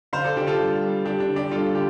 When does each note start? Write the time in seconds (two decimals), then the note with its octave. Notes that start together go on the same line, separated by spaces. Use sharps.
0.13 D3 C5 F5
0.24 A4 D5
0.36 D3 D4 G4
0.47 F4 A4
0.59 G2
0.82 G3
1.05 G3 D4 G4
1.20 D4
1.29 D3
1.36 D4 G4
1.51 G2 F4 A4
1.74 D3 G4